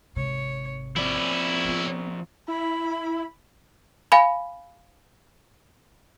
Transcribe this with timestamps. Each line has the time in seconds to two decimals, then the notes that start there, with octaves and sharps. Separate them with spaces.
0.16 G#1 C3 C#5
0.96 F3 C4 C#4 E4 D5
1.65 B3 F4
2.48 E4 B5
4.12 F5 G#5 B5